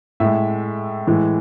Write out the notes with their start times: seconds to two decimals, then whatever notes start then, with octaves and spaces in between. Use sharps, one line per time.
0.20 A2 G#3 E5
1.07 A2 E3 G#3